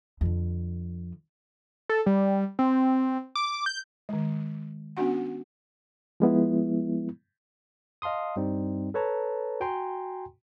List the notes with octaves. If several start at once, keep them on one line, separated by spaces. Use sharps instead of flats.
F2 D3
A4
G3
C4
D6
G6
D#3 G#3
B3 C#4 D4 F#4 F#5
F3 G#3 B3 E4
D#5 F5 A5 C6 D#6
G2 G3 C4 D#4
A4 B4 C#5 A5 A#5
F#4 G5 G#5 A#5 C6